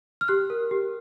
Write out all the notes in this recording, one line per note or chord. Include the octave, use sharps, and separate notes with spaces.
F6
G4 F#6
A#4
G4